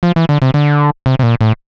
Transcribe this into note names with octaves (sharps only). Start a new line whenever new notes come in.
F3
E3
D3
C3
D3
C3
C3
A#2
A2